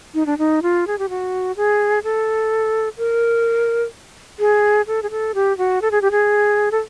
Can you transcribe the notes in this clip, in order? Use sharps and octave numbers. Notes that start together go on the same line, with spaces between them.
D#4
D4
D#4
F4
G#4
G4
F#4
G#4
A4
A#4
G#4
A4
G#4
A4
G4
F#4
A4
G#4
G4
G#4
A4